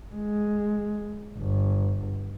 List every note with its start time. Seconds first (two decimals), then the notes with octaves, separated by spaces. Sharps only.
0.15 G#3
1.39 G1